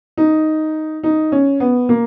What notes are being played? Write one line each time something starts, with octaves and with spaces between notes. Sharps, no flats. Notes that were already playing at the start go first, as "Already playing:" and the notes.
D#4
D#4
C#4
B3
A#3